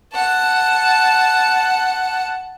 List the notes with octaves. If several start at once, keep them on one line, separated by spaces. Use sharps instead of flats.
F#5 A5